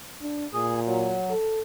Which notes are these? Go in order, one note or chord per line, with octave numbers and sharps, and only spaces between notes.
D4
A#2 G#4
F#3
A4